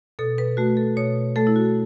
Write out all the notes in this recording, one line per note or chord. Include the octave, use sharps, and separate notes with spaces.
B2 A4
B4
A3 F#4
A4
B2 C#5
A3 A4
E4
F#4